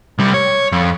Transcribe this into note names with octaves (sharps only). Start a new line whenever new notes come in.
C2 G3
C#5
F2